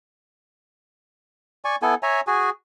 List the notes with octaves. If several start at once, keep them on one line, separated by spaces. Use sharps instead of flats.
D5 G#5 C#6
B3 E4 A4 G#5
C#5 E5 G#5 A#5
F#4 G#4 G#5